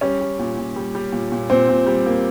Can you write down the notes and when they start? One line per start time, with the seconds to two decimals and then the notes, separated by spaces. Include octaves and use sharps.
0.01 G3 C#4
0.20 G3
0.39 A#2
0.58 A#2
0.76 G3
0.95 G3
1.12 A#2
1.32 A#2
1.50 A#2 C4
1.69 A#2
1.86 G3
2.06 A#3